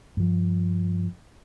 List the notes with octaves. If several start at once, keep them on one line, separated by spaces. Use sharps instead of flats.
G2 F3